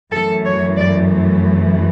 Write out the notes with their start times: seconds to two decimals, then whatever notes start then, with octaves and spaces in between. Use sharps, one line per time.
0.12 F#2 E3 A3 A4
0.44 C#5
0.77 D5